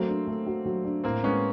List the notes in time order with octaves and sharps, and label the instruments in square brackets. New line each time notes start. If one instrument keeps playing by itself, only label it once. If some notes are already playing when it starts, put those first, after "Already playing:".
Already playing: [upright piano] F#3 A3 [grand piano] A#3 C4
[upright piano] D4
A3
F#4
F#3
D4
[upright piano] A2 [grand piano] A#3 C4
[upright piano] G#3 [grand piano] B3 C#4